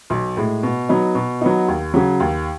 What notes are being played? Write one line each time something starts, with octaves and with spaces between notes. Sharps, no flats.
B1
A2 G#3
B2
F#3 B3 D#4
B2
F#3 B3 D#4
D#2
C#3 F#3
D#2